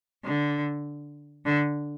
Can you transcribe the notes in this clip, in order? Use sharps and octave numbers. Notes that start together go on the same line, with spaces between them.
D3
D3